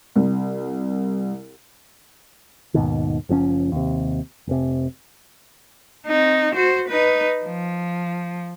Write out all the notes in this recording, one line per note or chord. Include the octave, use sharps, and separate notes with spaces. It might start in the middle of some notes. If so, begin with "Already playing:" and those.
C2
D#2 G#2 B2 D#3
F#1 F3 C4 C#4
D#2 C3
F1 C3
C4 D#4
F#4 C5
D#4 B4
F3